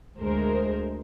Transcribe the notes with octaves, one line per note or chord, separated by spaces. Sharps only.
D2 G#3 A#4 C5